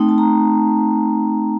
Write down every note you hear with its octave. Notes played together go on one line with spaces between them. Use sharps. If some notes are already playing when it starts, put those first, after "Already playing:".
Already playing: A3 C4 D#4 G5
A5
A#5